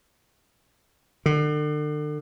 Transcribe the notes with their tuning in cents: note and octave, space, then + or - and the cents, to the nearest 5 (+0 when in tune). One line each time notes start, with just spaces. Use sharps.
D3 +35